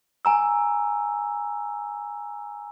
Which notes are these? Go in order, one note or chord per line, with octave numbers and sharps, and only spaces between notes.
G#5 A#5 E6